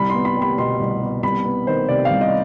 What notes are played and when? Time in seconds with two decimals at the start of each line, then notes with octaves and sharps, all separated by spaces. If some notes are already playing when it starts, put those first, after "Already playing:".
Already playing: C2 B5
0.10 B3 C6
0.25 B5
0.37 G3
0.42 B5
0.58 B2 C6
0.80 C2
1.01 B3
1.23 C2 B5
1.45 B3
1.67 D#3 C5
1.88 C3 D5
2.05 F5
2.11 C2
2.21 D#5